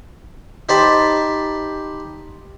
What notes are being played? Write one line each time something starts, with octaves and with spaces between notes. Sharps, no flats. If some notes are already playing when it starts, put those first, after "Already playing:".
D#4 G4 C5 A5 B5